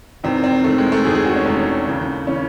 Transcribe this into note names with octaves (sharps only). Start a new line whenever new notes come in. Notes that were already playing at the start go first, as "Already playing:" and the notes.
E1 E2 D#3 C4
C4
E1 E2 D#3 A3
G#3
A3
E1 E2 D#3 G#4
G#4
F#4
C#4
E1 E2 D#3 A3
D#2 C#3 E3
C#3 E3 C#4